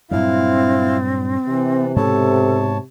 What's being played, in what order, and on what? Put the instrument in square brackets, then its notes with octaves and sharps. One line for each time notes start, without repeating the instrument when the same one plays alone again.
[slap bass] G2 A#2 F#3 [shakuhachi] C4 [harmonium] E4 F5
[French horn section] C3 [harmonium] E3
[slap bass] G#2 B2 [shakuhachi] A4 [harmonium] C#5 A5